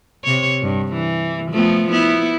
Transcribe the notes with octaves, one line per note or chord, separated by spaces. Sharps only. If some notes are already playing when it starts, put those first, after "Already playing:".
C3 C#5
G2
E3
F3 A3 B3
B3 E4